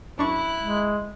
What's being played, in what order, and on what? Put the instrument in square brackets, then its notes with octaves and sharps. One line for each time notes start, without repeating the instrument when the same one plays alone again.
[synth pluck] F#2 D4 C#6 [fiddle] E4 F#6
[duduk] G#3